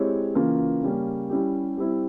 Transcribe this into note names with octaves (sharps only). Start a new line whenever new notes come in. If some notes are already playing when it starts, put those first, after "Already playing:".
Already playing: G#3 C4 E4 G4 C#5
C#3 E3 A#3 C#4 F4
C#3 G3 A#3 C#4
G3 C#4 E4 G4
G3 C4 E4